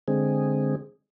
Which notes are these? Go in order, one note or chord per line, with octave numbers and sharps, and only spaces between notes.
D3 G#3 C4 G#4